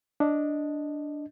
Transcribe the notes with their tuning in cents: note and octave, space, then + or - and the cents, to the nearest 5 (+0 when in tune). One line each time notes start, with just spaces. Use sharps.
D4 +0 D#5 +0